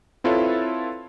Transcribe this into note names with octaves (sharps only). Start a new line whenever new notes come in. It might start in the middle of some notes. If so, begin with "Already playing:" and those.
C4 E4 F4 A4 B4 C#5